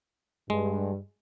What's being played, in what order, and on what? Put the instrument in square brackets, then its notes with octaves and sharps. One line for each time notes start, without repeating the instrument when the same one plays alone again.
[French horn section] G2 [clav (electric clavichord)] G#3